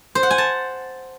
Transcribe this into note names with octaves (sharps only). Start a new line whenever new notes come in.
C5
F#5
G#5
A5